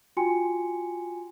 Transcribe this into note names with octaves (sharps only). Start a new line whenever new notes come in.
F4 F#4 G5 G#5 C6 C#7